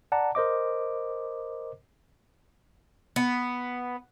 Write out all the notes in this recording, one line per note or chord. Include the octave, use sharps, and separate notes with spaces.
D5 F#5 A5 A#5
A#4 C5 D#5 D6
B3